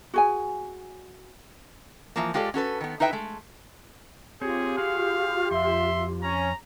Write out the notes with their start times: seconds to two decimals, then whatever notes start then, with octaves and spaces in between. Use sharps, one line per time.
0.14 F#4 G#4 G#5
2.16 E3 F3 A#3
2.34 G#3 F4 G4 A4 B4 D5
2.54 C#4 F#4 A4 B4
2.80 D#3 B3
3.00 D#4 E4 B4 E5 G5
3.13 G#3 A3
4.41 C4 F4 G4 G#4 C#5
4.77 F#4 G#4 F5 G#5
5.51 F2 E5 C6
6.22 C#4 A#5